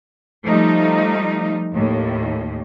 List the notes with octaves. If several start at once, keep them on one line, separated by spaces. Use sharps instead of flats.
F3 G3 A3 D#4
D#2 A2